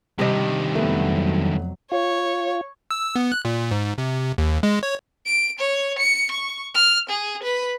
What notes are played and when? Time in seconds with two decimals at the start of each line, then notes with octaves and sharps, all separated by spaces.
0.19 G2 C3 D#3 G3 D#5
0.75 F2 F#3 A3 B3
1.92 F4 C#5
2.91 E6
3.16 B3
3.32 F#6
3.45 A#2
3.71 G#2
3.98 C3
4.38 D#2
4.63 G#3
4.83 C#5
5.26 D7
5.59 C#5
5.99 C#7
6.31 C#6
6.75 F6
7.09 G#4
7.43 B4